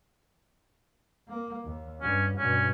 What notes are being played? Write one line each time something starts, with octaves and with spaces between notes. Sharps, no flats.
A#3
D#2
G2 C#4
G2 B2 C#4